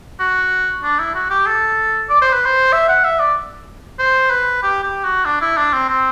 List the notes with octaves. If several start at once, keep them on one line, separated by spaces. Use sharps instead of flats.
F#4
D4
E4
F#4
G4
A4
D5
C5
B4
C5
E5
F#5
E5
D5
C5
B4
G4
G4
F#4
D4
E4
D4
C4
C4